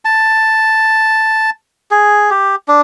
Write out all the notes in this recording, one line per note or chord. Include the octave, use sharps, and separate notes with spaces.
A5
G#4
G4
D4